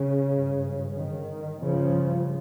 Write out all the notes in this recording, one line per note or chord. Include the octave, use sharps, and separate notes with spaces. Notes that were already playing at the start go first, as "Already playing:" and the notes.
Already playing: C#3
G#1 G2
D#3
G#1 G2 C#3 F3